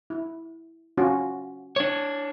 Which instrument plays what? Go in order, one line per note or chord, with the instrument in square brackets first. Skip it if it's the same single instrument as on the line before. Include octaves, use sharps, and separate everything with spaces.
[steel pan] E4
C#4 F4 F#4
[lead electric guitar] D4 C#5